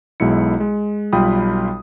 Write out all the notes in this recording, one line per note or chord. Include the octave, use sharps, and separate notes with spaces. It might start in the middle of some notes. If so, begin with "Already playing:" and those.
B1 B2 G#3 E4 C#7
G#3
B1 G3 F4 G5 B5 D#6